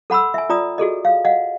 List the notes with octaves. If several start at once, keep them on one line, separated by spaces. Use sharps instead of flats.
A4 F#5 B5 C6 E6
E5 G#5
F4 D5 A#5 D#6
F#4 G#4 A4 D#5
F5
D#5 F5 F#5